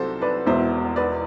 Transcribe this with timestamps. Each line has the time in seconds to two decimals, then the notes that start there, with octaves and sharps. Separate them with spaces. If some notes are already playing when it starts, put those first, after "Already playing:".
Already playing: C2 C3 F#3 C4 A4 C5
0.21 B4 D5
0.46 E1 E2 B2 C5 E5
0.96 B4 D5